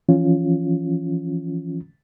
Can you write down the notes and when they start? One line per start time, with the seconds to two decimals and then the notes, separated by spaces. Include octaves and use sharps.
0.09 E3 F3 C#4 F4